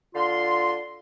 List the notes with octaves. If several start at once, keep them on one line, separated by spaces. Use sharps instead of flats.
D3 F4 F5 C6